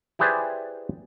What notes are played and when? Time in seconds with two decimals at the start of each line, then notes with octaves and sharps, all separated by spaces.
0.19 E4 G4 G#4 B4 C5 D5